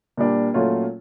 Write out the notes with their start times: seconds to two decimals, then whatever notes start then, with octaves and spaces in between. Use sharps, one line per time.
0.17 A#2 G3 A#3 D4
0.54 A#2 F#3 A3 C#4 F4